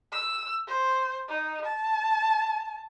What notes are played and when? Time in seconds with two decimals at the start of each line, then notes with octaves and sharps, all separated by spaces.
0.12 E6
0.67 C5
1.28 D#4
1.65 A5